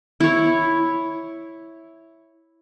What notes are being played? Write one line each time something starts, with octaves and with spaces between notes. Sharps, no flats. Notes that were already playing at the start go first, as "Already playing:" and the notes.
E4 C#5